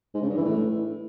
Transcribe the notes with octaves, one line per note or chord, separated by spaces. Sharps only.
G#2
C#3
G2
E3
A2